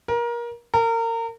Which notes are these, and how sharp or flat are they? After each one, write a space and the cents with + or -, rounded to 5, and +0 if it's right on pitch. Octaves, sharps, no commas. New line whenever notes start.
A#4 +25
A#4 -30